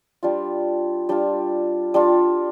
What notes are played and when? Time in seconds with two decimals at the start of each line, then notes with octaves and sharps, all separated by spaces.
0.23 G3 D4 F4
1.09 G3 D4 F4
1.94 G3 D4 F4